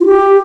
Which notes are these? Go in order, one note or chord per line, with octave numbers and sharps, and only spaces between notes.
F4
G4